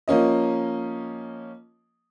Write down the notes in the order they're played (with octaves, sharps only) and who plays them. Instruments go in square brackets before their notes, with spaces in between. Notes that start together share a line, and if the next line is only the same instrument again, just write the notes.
[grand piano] F3 A#3 C#4 D#5